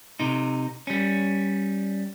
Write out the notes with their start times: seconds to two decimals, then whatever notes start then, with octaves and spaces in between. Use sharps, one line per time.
0.20 C3 D#4
0.87 G3 C#4